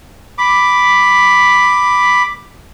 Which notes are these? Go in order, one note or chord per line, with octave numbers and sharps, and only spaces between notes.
B5 D6